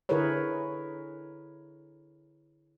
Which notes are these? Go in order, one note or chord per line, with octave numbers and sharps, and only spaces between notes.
D3 E4 G#4 A#4 B4 C#5